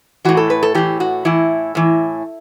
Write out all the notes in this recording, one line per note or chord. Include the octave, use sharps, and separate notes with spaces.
A2 E3 F#4
A4
B4
A4
A2 E3 G4
F#4
A2 E3 E4
A2 E3